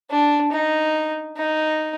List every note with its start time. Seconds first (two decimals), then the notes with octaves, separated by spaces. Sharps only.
0.10 D4
0.52 D#4
1.37 D#4